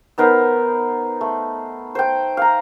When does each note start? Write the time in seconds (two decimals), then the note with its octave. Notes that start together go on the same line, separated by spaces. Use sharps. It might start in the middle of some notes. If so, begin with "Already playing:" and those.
0.18 B3 D#4 A#4 C5
1.21 A3
1.95 C5 G5
2.37 F5 A#5